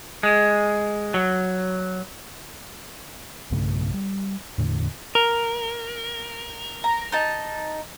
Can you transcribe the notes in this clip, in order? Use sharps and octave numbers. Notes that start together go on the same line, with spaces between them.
G#3
F#3
B1 G2 C#3 A3
G3
E2 A2 D3
A#4
A#5
D#4 A5